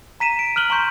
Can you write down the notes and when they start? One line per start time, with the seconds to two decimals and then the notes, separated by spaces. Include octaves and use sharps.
0.20 A#5 B6 D#7 E7
0.39 D7
0.56 F6 F#6 F#7 G7
0.70 A#5 C6 C#6 G6